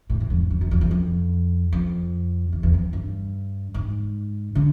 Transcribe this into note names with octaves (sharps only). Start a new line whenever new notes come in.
A2
G#2
F2
F2
F#2
F2
E2
F2
F2
E2
E2
F2
G2
G#2
D3